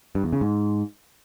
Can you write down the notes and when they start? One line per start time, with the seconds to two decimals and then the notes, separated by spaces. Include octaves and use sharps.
0.15 G2
0.24 E2
0.33 C#3
0.41 G#2